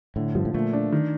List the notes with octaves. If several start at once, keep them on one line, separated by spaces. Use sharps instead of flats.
A2 D3
G2 F3
A2
A#2 A3
D4
D#3